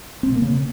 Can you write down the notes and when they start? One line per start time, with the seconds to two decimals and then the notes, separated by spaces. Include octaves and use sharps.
0.23 C4
0.29 B2
0.35 A#3
0.42 C#3